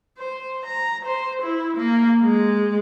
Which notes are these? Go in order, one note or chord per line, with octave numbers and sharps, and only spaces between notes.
C5
A#5
C5
E4
A#3
G#3